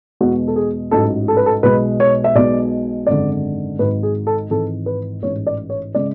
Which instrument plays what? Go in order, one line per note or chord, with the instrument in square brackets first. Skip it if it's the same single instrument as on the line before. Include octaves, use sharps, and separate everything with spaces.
[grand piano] E2 B2 G#3 F#4
A4
G#4
A1 G#2 F#3 A4
A4
B4
A4
B1 B2 G#3 B4
C#5
E5
B1 B2 G#3 D5
G#1 F#2 D3 G#3 D5
G#1 G#2 F#3 B4
G#4
A4
G#1 G#2 E3 G#3 A4
B4
A1 G#2 E3 G#3 C#5
D5
C#5
C#3 G#3 D5